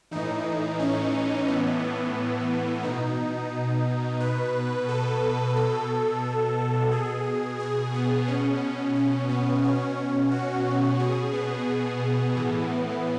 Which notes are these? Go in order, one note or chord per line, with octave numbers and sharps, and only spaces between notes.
A2 E3 D#4
C#4
A2 E3 B3
B2 D#4
B2 B4
A4
B2 A4
B2 G#4
G#4
B3
B2 C#4
C#4
B3
B2 C#4
F#4
B2 G#4
B3
A2 E3